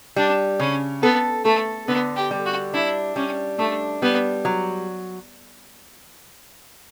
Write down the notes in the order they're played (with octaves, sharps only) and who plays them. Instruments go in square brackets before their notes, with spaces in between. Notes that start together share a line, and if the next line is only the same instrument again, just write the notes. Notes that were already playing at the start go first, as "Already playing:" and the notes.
[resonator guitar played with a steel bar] G3 [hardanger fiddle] D4
[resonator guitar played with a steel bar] C#3 [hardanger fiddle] C#4
[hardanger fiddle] B3 [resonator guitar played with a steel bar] A4
[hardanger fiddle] A3 [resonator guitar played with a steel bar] A4
[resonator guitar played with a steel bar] D3 [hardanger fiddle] B3
[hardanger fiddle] G4
[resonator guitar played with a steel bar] G3
[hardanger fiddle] F#4
[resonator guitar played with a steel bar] D4 [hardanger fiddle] E4
[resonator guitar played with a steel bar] G3 [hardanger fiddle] C#4
[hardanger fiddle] A3 [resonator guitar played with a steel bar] D4
[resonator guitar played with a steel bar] G3 [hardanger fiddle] B3
[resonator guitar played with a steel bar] F#3